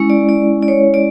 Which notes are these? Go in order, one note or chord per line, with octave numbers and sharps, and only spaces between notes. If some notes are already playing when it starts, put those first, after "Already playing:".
Already playing: G#3 C#4 E4
D5
D5
D5
C#5
D5